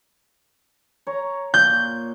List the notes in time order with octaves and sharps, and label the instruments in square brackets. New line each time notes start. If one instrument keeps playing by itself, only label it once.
[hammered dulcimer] C#5 A#5
[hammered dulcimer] A#2 [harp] G6